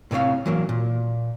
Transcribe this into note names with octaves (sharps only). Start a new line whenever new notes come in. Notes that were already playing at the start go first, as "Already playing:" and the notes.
A2 C3 A4 C#5 F5
E3 F#3 A#3
A#2